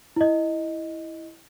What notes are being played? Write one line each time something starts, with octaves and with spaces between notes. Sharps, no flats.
E4 D#5